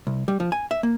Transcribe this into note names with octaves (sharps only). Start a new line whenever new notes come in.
C2
G3
F3
G#5
E5
A#3